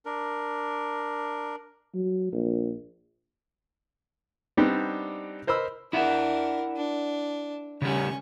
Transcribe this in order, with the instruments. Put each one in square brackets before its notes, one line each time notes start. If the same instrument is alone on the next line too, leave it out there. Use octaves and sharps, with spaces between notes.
[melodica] D4 A#4
[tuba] F#3
A#1
[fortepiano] G3 B3 C4 D4 D#4 G4
A#4 C5 D#5 B5 E6
[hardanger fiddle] D4 A#4 [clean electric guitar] E4 E5 F#5
[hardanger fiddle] D4
[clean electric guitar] C#3 G3 [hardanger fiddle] C#4 C#6